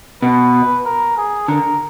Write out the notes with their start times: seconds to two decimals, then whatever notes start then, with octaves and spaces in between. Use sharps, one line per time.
0.22 B2 B4
0.86 A#4
1.18 G#4
1.48 D3 A#4